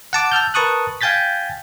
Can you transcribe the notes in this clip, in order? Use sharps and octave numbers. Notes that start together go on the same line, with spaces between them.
F#5 A5 D6
A5 E6 F6 G6
A#4 B4 A5 C#6 D#6 F#6
F5 G5 G#5 G6 A6 B6